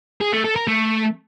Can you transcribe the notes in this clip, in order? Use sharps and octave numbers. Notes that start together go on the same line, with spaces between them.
G#4
A3
A4
A#4
A3